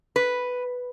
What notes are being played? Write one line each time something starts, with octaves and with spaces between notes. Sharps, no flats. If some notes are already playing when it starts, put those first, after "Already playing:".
B4